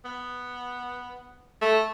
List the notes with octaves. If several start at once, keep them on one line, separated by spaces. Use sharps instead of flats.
B3
A3